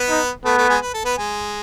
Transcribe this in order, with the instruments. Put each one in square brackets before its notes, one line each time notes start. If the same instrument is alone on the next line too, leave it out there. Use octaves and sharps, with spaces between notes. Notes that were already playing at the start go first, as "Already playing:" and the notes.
Already playing: [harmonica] B3 B4
[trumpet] D#4
[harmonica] A3 A4 [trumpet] B3
[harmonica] A3 A4
G#3 G#4
B4
A4
B3 B4
G#3 G#4